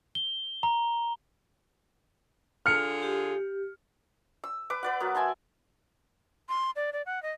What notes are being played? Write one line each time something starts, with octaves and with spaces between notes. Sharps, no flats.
G7
A#5
D3 F4 G#4 F6 C#7
G4
E6
B4 D6
B4 D5 F#5
F#3 A#3 B3
E5 G#5 A5 C6
C6
D5
D5
F#5
D#5